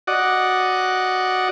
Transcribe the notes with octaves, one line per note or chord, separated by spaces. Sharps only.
F#4 D5 D#5 F#5